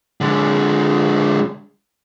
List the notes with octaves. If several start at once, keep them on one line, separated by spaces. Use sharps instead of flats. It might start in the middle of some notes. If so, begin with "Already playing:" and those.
D3 G#3